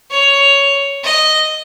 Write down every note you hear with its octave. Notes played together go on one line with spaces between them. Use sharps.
C#5
D#5